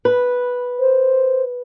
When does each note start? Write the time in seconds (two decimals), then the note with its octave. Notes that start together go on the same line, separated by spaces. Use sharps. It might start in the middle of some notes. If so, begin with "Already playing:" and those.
0.05 B4
0.80 C5